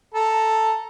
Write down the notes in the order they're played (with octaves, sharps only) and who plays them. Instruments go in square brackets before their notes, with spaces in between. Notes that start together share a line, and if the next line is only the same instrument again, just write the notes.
[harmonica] A4 A#5